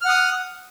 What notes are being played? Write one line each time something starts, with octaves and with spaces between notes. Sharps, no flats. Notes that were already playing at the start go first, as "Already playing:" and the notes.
F#5 D#6 F6